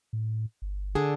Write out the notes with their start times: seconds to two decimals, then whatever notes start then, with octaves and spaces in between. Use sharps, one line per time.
0.13 A2
0.62 G1
0.95 D3 D4 G#4